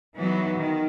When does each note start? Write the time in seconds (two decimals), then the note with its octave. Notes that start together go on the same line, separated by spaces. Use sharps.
0.15 E3 F#3 B3 D#4
0.57 D#3